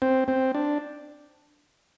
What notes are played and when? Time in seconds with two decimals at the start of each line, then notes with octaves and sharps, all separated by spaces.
0.02 C4
0.28 C4
0.55 D4